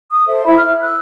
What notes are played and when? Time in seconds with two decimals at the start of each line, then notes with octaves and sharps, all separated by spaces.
0.10 D#6
0.26 A4 C5 E5
0.44 E4 E5 B5
0.56 F6
0.80 E6 F#6